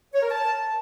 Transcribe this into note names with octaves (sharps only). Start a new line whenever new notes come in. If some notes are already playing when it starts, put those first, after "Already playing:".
C#5
A#4
A5